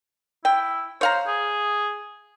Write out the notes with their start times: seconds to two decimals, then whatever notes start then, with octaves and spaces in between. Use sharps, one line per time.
0.45 E4 G5
1.01 C5 C#5 F5 A#5
1.27 G#4